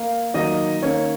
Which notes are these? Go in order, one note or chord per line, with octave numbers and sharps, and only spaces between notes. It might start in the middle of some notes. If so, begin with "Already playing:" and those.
Already playing: A#3 F5
D#3 F#3 A#3 D#4 D#5
D#3 A#3 C#4 C#5